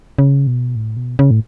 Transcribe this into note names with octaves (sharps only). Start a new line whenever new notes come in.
C#3
B2
A2
B2
C#3
A2